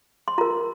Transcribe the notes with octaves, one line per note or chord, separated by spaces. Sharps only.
C6
F4 A#4 A#5